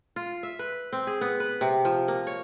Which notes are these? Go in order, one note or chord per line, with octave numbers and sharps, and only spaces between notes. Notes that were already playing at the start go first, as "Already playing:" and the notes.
F4
E5
B4
C4
G#4
B3
B4
C3
F3
A#3
C#5